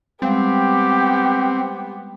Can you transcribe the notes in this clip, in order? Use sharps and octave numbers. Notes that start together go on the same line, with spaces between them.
G3 G#3 B3 C4 G4 F5